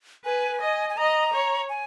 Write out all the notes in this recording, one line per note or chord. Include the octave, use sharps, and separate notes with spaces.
B4 G#5
D#5
G#5
D#5 A#5
C#5
G#5